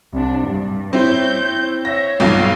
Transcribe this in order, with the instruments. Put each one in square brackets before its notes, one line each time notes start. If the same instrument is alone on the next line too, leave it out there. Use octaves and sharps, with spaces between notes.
[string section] C2 D4
G2
[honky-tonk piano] C4 E4 [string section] C#5 G6
[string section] C#5 E5 [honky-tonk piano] A#6
[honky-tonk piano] B1 G2 F3 [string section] F5